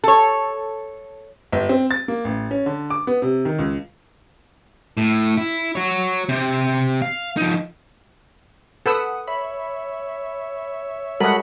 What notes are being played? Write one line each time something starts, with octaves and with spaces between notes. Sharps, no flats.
A4 C#5
G1
C4
A6
A#3
A1
C#4
D3
D6
B3
C3
D#3
C#2
A2
E4
F#4 C#5
C3 C5
F5
F3 D#4
A4 B4 F#5 D#6 E6
C#5 E5 B5
G3 G#3 F#4 A4 A#4 F#5 B5 D#6